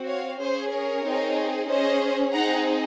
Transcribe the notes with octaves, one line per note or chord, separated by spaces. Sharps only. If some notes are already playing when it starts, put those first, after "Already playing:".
Already playing: C4 F#4
C#5 F5
C#4 G#4 C5
A#4 C#5
C4 D#4 G#4
C#4 G#4 C5 D#5
C4 D#4 G#4 F#5 A#5